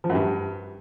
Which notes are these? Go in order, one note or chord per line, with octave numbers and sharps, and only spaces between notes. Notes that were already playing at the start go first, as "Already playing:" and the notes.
F3
F#2
G2